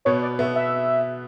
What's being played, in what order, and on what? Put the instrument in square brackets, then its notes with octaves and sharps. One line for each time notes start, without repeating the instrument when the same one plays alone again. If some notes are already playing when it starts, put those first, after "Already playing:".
[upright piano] B2 B3 [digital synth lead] C#5
[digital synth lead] D5
[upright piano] B2 B3 [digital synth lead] E5
[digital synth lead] E5